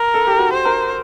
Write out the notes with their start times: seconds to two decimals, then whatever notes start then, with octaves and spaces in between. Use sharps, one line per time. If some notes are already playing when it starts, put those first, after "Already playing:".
Already playing: A#4
0.14 A4
0.27 G4
0.39 F#4
0.53 C5
0.65 A#4